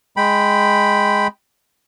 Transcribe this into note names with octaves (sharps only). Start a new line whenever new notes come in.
G#3 G5 B5